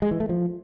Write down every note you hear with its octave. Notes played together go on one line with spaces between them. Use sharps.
G#3
E3
A3
F3